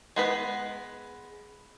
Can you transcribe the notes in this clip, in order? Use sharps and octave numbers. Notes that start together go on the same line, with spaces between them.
G#3 B3 B4